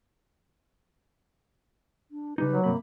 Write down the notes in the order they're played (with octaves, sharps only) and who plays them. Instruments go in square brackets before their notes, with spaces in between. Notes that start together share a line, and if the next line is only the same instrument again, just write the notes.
[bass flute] D4
[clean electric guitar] C#3 G3 D#4 [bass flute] B4
[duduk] F#3
[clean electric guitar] G2 C3 B5 [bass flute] A#3